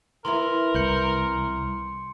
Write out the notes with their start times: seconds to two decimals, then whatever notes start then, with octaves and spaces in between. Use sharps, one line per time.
0.25 E3 B3 E4 A#4 C6
0.75 C2 C6 G6 C#7